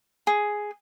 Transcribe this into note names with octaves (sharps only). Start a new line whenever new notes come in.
G#4